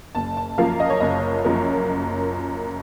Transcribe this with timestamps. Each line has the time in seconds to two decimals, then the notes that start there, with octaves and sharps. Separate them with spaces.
0.15 F#1 A5
0.37 A5
0.58 F#2 F3 A#3 F5
0.80 D#5
0.90 C#5
1.00 F#1 D#5
1.45 F#2 F3 A#3